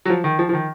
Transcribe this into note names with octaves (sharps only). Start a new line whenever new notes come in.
F#3
F3
D#3
F3
F3
D#3